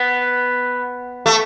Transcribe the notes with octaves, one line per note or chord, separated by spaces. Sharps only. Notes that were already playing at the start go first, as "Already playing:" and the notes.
Already playing: B3
A3